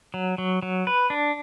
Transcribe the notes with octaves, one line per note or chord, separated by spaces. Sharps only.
F#3
F#3
F#3
B4
D4